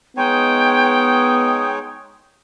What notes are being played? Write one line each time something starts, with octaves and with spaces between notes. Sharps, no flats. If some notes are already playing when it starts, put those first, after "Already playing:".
G#3 B3 D#4 C#5 G5 D#6